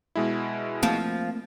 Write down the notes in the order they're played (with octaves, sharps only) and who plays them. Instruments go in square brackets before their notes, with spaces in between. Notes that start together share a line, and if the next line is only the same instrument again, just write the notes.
[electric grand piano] B2 G#3 E4
[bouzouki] F3 [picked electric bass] A3 A#3 C4